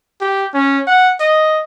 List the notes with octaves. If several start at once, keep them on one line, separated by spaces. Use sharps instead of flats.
G4
C#4
F#5
D#5